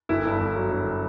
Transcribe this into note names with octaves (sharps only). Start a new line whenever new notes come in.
G1 E4
G2
G1
F#3
G1